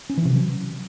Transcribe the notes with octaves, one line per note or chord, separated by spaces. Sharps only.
C#4
E3
C3
F#3